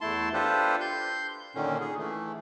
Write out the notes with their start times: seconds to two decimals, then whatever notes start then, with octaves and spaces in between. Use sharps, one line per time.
0.01 E2 A3 E4 A5 C6
0.34 D4 F4 G4 A4 B4 C5
0.81 C6 G6
1.55 A#2 D3 D#3 C#4
1.80 G#4
1.98 E3 A3